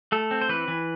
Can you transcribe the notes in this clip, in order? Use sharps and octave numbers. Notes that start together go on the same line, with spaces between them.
A3 A4
C4
C5
E3 B4
E3